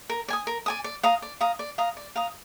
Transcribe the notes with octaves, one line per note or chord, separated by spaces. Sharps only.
A#4
D5 G#5 D#6
A#4
D5 G#5 D#6
D5
F5 A#5 D#6
D5
F5 A#5 D#6
D5
F5 A#5 D#6
D5
F5 A#5 D#6